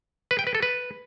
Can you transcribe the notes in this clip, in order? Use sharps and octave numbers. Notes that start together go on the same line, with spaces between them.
B4
G5
B4
A4
B4